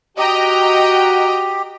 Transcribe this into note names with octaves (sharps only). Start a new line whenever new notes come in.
F#4 G4 D#5 G5 A#5